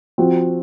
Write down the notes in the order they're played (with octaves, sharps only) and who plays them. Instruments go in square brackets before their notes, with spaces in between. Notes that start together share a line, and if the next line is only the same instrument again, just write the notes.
[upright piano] F3 C4 F#4